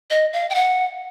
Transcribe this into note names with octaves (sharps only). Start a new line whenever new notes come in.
D#5
F5
G5
F#5